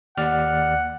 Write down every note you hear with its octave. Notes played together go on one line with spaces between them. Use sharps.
D#2 D5 F#5 F6